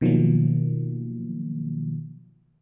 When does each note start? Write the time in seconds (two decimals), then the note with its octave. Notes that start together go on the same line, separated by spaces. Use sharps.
0.01 B2 D#3 F3 F#3 A#3